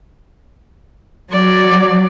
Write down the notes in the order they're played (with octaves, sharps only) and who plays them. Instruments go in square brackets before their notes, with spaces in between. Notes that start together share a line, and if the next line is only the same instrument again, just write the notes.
[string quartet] F#3 [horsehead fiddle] D5